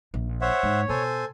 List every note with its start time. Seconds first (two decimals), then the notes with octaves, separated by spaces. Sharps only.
0.14 A#1
0.41 C5 C#5 E5 F#5
0.63 G#2
0.89 B2 A4 C5 G#5